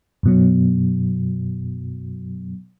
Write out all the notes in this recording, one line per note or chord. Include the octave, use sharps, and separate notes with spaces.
F#2 B2 F#3